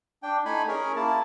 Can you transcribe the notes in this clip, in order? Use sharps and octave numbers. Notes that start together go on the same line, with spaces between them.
D4 G5
A3 D#4 E4 G#5 B5
C#4 G#4 A#4 C#5
A#3 E4 A5